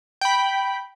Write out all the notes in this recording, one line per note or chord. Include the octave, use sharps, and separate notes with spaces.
G5 B5